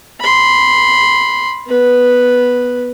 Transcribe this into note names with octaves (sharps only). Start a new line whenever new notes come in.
B5 C6
B3 B4